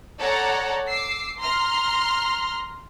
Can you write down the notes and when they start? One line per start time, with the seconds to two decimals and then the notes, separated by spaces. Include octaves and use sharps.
0.20 A4 C#5 D5 F#5 A#5
0.89 D6 E6 C7
1.38 A#5 C6 F6